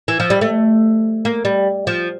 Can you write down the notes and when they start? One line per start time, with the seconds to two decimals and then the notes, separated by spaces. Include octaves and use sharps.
0.08 E3
0.20 F3
0.30 G3
0.41 A3
1.25 A#3
1.45 G3
1.87 F3